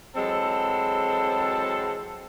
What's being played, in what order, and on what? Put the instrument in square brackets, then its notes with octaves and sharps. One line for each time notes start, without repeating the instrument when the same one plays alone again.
[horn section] E3 F#3 G#3 C4 A4